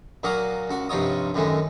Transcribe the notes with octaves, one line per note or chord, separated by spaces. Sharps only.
A#2 F#3 A#3 F#4 F5 D#6
C#2 F#4
G2 C3 F3 D#4 C#5 D#6
F#2 A2 D#3 E3 G#3